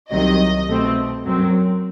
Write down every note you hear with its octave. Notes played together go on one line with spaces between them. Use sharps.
C2 C3 D#3 F#3 D#5
B2 A3 C4
F#2 F#3 C4